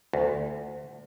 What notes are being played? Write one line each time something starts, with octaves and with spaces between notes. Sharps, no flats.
D2